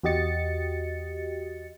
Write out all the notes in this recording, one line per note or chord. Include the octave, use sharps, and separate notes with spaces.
E2 F#4 G4 D#5 A6 C#7